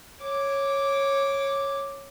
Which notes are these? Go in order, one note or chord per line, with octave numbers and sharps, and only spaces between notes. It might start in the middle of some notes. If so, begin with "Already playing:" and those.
C#5 D6